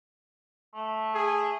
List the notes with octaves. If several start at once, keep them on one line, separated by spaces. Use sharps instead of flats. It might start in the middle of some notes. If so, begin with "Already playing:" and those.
A3
G#4